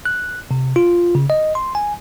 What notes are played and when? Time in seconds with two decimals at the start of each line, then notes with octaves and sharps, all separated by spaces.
0.05 F#6
0.51 C3
0.76 F4
1.15 C#3
1.30 D#5
1.55 C6
1.75 G#5